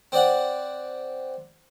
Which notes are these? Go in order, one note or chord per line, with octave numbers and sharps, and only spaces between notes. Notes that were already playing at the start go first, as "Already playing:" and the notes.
C4 D5 F#5